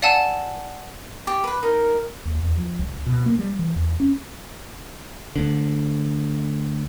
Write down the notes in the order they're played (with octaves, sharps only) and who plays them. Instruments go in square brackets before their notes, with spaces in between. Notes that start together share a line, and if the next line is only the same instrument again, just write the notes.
[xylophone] D5 F5 F#5 G#5 A5 E6
[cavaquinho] G4
B4 B5
[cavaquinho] D#4 [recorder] A#4
[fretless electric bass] D#2
E2
F3
C#2
C#2
B2
A#3
G3
E3
E2
C#4
[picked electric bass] D2 D3